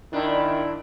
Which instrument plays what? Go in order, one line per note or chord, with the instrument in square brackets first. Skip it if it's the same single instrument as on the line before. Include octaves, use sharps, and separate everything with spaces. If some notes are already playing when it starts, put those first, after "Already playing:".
[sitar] A#2 D4 [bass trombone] D#3 [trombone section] E4